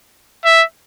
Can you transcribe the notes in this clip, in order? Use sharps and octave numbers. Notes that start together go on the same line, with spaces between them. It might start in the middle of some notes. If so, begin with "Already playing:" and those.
E5